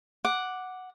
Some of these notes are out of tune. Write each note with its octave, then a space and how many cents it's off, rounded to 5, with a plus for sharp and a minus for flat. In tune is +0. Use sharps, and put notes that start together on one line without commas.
F#5 +0 D6 +0